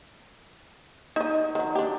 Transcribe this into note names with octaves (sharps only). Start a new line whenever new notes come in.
D#4 D#5
D#3 F#3
D4 G4